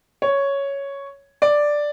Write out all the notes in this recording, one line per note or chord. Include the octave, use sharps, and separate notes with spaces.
C#5
D5